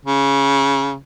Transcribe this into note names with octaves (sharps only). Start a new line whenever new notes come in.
C#3